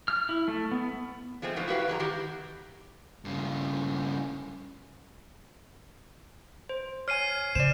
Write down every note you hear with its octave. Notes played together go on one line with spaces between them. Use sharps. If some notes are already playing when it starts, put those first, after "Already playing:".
F6
E4
A3
B3
F3 G#3 A3 C4
B2 E3 F3 A3 B3
E4 F#4 G4 B4 F5
E2 G2 G#3 A#5
D#3 E4 F#4 G4
G2 C#3
C5
C#5 G#5 F6 C7 D#7
C#3 C5 D5 E7